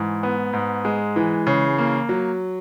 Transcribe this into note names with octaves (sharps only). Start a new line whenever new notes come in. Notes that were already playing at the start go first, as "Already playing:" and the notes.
Already playing: G#2 E3
B3
G#2
G#3
E3
C#3
A#3
F#3